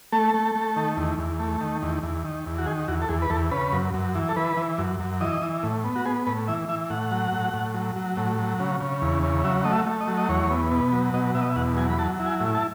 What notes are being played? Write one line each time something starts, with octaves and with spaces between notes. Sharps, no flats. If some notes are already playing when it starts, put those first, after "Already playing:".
A3 A4
A3
A3
D#3
E2
E2
A3
D#3
E2
E2
D#3
E2
F#4
D#3 G#4
E2 F#4
A4
E2 G#4
B4
E2 A4
C#3 B4
F#2
F#2
E3
A4
E3 B4
E3
F#2
F#2
E3 D#5
E3
A2
B3
F#4
B3 G#4
A2 B4
E3 E5
E3 E5
A2 F#5
F#3
A2
A2
F#3
F#3
A2
F#3
C#3
C#3
E2
C#3
F#3 E5
A3 D#5
E5
A3
D#5
F#3
D#5
E2 C#5
B3
B2
F#3
B2 D#5
B2 E5
D#5
E5
E2 F#5
F#3 G#5
B5
F#3 A5
E4
G#5
A2
A5